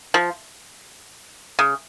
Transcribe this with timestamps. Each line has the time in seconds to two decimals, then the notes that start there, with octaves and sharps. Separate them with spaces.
0.14 F3
1.59 C#3